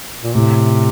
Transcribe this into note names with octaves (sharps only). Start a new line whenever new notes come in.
A#2
A2 C3